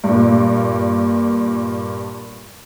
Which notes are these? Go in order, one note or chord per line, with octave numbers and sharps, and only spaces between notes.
G2 A#2